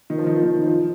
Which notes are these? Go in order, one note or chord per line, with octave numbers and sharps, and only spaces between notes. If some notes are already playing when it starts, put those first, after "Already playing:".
D#3
F3
D#3
F3
D#3
D#3
F3